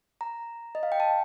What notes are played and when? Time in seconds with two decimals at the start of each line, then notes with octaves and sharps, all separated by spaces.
0.21 A#5
0.75 D#5
0.83 F5
0.92 G5
1.00 A5